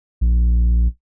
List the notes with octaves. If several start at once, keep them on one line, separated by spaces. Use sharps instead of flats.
A#1